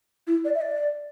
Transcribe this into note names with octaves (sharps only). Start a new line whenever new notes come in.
E4
D5
E5
D5